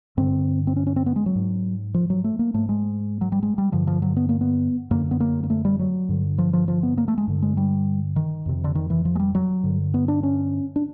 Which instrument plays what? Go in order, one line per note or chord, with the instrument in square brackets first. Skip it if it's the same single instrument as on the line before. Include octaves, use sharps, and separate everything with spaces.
[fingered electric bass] G2 D3 C4
C4
C#4
C#4
C4
B3
G#3
F#3
G#2
F3
F#3
A3
A#3
G#2 A3
G#3
F#3
G3
G#3
G3
G2 D3 F3
F3
F#3
B3
A#3
B3
F#2 D3 A#3
B3
A#3
A#3
A3
G3
F#3
G2 D3
F3
F3
F3
B3
A#3
A3
G#3
G2 D3
G#3
G3
D#3
F2 C3
D3
D#3
E3
F3
G#3
G3
F#3
G2 D3
B3
D4
C#4
D4